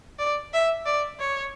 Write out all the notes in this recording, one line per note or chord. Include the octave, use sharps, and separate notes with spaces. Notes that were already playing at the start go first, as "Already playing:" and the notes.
D5
E5
D5
C#5